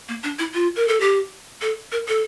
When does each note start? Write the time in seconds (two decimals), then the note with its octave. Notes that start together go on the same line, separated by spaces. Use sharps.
0.08 A#3
0.23 D4
0.39 E4
0.54 F4
0.76 A#4
0.88 A4
1.00 G4
1.62 A4
1.92 A#4
2.08 A4